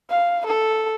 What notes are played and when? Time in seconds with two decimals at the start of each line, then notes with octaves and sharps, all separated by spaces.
0.10 F5
0.47 A4